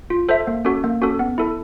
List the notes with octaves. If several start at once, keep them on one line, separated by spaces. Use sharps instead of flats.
F4
A4 C5 E5
A#3
C#4 F#4 A4
A#3
C#4 F#4 A4
B3
E4 A4